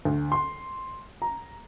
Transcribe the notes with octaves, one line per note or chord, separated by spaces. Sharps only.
D2
C6
A#5